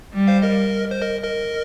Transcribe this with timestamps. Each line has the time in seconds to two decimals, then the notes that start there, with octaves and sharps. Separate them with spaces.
0.13 G3
0.27 C5 F5
0.42 A#4 D#5
0.91 C5
1.02 A#4 D#5
1.23 A#4 D#5